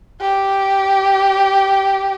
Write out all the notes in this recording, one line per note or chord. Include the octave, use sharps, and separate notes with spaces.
G4